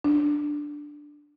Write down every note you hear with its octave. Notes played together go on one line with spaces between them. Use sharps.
D4